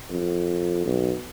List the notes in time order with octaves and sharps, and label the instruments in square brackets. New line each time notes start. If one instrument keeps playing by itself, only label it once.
[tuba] F2
B1